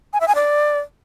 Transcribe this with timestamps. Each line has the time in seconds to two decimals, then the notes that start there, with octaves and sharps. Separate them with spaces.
0.13 G#5
0.21 E5
0.28 G#5
0.35 D5